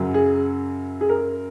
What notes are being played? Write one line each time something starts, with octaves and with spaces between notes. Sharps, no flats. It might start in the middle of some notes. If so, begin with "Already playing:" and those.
Already playing: F#2 C#3 F#3
G#4
G#4
A#4